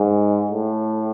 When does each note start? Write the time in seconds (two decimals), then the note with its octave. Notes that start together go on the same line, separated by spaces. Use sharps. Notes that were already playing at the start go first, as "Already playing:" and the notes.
Already playing: G#2
0.51 A2